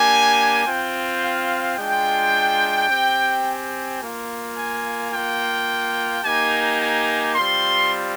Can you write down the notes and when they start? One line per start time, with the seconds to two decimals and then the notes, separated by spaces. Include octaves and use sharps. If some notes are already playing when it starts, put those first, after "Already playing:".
Already playing: A#3 D4 G4 G#5
0.64 C4 F4 G5
1.20 F5
1.76 G#3 D4 F4 G5
2.88 C4 G4
3.44 G#5
3.99 A#3 F4
4.55 G#5
5.11 A#3 F4 G5
6.23 A#3 D#4 G4 G#5
6.79 G#5
7.34 G3 C4 F4 C6